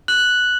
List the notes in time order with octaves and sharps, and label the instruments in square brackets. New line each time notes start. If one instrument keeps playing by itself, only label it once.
[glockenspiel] F#6 F#7